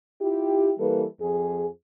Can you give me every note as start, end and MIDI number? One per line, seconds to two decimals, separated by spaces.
0.21 0.71 64
0.21 0.71 65
0.21 0.71 67
0.78 1.03 52
0.78 1.03 55
0.78 1.03 58
0.78 1.03 69
0.78 1.03 71
1.19 1.65 41
1.19 1.65 53
1.19 1.65 68